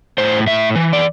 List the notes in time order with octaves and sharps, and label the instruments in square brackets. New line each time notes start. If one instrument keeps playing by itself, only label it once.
[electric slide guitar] A2 C5
A2 E5
E3
D5